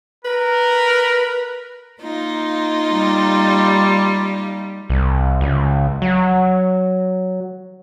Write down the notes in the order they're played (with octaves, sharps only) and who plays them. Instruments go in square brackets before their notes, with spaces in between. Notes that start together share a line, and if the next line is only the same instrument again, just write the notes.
[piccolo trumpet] A#4 [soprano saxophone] B4
[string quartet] A#3 D#4 F4
[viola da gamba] G3
[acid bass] C2
C#2
F#3